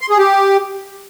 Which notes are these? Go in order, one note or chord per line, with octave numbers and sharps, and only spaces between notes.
C6
G#4
G4